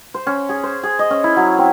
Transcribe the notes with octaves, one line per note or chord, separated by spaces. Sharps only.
C5
C#4
G#4
C5
G#4
D#5
C#4
E4
F#3
C4